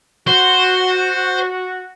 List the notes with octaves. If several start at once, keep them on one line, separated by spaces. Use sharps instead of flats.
F#4 C5